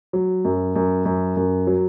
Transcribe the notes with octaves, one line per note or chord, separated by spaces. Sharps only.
F#3
F#2
F#2
F#2
F#2
F#3